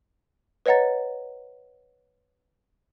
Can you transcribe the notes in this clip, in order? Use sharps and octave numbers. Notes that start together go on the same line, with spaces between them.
B4 C#5 D#5 F#5 A#5 A6